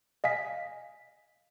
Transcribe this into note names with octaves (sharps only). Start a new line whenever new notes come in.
D#5 F5 G#5 B6